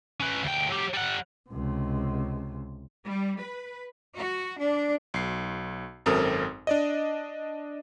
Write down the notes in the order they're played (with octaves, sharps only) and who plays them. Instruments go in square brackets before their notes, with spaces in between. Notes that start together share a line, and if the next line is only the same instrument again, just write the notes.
[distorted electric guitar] C#4 B4
D2 G5
F#3 G4
G3 F#5
[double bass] C#2 C3
[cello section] G3
B4
F#4
D4
[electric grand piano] B1 C7
G#1 F#2 C4 A4 A#4 D#6
D4 D5 D#5